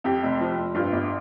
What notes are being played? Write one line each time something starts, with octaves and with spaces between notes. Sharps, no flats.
F2 G4
F1
F3
F1
G2 F4
G1